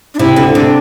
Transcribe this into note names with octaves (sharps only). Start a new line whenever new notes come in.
D4
C3 E4
D2 D3
C3 D4